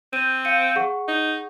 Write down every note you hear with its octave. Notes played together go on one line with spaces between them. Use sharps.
C4 G6 D#7
F5 C#7 D#7
G#4 F#5 C#6
D#4